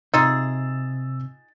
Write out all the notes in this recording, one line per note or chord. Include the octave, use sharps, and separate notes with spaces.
C3 D#4 F4 G#4 E6 A6